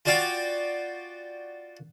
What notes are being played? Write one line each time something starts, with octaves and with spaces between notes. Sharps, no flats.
F4 F#4 D5 F5 G5